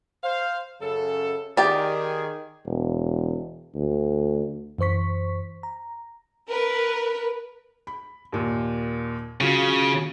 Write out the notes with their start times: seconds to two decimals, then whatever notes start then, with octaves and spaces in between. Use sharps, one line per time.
0.23 C5 F5
0.81 F#2 C#3 A4
1.57 D#3 G4 G#4 D5
2.67 E1
3.75 D2
4.78 F#2 E3 C5 C#6 B6
5.63 A#5
6.48 A#4 B4
7.87 B5
8.32 D#2 A#2
9.41 C#3 F#3 F4